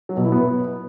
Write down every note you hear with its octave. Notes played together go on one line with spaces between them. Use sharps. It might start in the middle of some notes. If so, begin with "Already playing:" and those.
F#3
B2
E4
B3